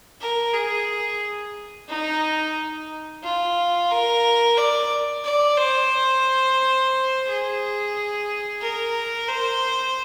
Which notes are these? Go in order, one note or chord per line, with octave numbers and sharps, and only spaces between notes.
A#4
G#4
D#4
F4
A#4
D5
D5
C5
G#4
A#4
C5